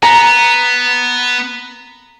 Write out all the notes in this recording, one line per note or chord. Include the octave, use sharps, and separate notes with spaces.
B3 A#5